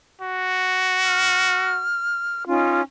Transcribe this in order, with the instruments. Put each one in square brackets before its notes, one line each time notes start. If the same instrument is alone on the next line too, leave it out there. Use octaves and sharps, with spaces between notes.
[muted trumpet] F#4
[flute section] F6
C#4 D#4 F4